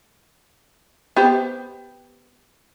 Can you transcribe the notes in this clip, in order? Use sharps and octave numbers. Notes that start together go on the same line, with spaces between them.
B3 G4 C5